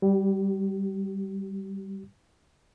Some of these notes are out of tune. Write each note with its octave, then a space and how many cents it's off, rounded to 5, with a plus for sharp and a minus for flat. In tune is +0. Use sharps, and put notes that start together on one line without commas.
G3 +0 G4 -40